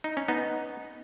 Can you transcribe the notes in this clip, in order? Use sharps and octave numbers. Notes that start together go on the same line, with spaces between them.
D#4
C#4
B3 D#4